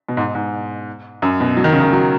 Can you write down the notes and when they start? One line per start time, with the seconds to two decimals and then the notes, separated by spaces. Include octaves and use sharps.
0.09 B2
0.17 G#2
0.35 G#2
1.22 F#2
1.40 B2
1.57 F#3
1.64 D#3
1.72 C#3
1.80 D#3
1.93 F#3